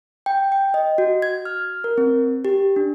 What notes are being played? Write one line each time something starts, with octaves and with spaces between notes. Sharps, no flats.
G5
G5
D#5
F#4
G#6
F6
A#4
C4
G4
D4